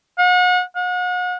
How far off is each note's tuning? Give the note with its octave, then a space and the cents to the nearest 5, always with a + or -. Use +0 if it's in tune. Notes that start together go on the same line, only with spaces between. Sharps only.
F#5 -40
F#5 -40